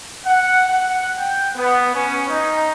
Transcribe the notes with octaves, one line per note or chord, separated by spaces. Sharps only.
F#5
F#5
G5
B3
C#4
D#4